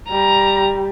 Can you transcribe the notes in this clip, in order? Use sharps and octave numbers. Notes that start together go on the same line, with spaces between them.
G3 A#5